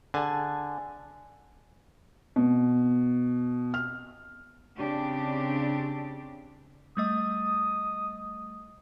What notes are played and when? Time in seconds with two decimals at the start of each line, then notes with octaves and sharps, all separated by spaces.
0.14 D3 G#4 G#5 A5
2.36 B2
3.74 F6
4.77 C#3 C4 D4 G4
6.97 G3 A3 D#5 D#6